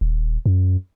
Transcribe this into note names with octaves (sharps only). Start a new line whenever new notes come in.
D#1
F#2